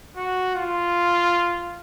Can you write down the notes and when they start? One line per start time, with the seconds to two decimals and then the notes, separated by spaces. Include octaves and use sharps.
0.17 F#4
0.56 F4